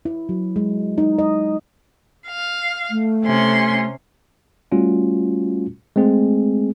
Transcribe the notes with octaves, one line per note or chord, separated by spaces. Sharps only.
E4
F#3
G#3
D#4
D#5
F5
A3
C3 C#4 C6
G3 A3 C#4 F4 F#4
G#3 A3 C4 G#4